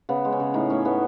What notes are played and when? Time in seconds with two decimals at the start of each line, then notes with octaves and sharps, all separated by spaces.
0.09 C#3 B3
0.25 G#3
0.32 C#4
0.40 C#3
0.54 A2 D#4
0.70 A2 C#4
0.85 A3 B3